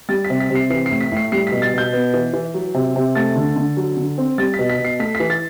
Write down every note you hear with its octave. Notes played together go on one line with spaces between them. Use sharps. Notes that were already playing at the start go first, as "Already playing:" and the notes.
G3 A6
B6
C3
B6
C3
C7
E3 C7
C7
A2
B6
A2 C7
G3 C7
B2 B6
A6
B2 G6
B3
E3
E3
F#3
C3
C3
A3 A6
D3
D3
F#3
D3
C4
G3 A6
B6
B2
B6
B2
C7
A3 B6
B6
E3
A6